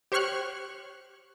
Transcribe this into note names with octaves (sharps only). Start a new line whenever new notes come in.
G4 C5 C#5 C#6 F6 F#6